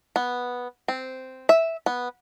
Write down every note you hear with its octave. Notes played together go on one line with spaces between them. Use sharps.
B3
C4
E5
B3